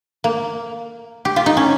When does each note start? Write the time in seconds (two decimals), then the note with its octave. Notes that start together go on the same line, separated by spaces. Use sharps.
0.24 A#3
1.25 G4
1.36 F4
1.46 D#4
1.57 C#4